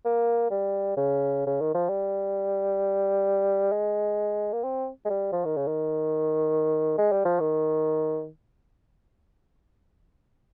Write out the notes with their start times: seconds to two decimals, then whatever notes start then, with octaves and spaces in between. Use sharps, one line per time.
0.05 A#3
0.51 G3
0.97 C#3
1.47 C#3
1.61 D#3
1.75 F3
1.89 G3
3.72 G#3
4.53 A#3
4.64 C4
5.05 G#3
5.10 G3
5.32 F3
5.45 D#3
5.57 C#3
5.67 D#3
6.98 G#3
7.12 G3
7.25 F3
7.40 D#3